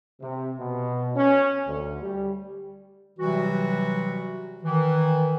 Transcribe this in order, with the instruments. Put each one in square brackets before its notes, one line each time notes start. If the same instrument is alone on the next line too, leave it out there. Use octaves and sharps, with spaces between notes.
[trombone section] C3
B2
C#4
D2
G3
[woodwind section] C3 E3 F#3 G3 F#4
D#3 E3